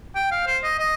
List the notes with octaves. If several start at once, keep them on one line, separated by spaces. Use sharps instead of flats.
G5
F5
C5
D#5
D#5